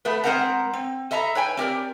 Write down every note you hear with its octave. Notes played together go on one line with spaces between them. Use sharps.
A3 B3 B4
G#3 B3 C4 A#4 F#5 A#5
C4
A4 D#5 E5 A#5
B4 C#5 G5 G#5
C4 G4 A#4 D5